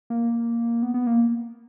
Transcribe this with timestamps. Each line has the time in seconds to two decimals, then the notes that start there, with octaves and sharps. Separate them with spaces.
0.10 A#3
0.83 B3
0.94 B3
1.07 A#3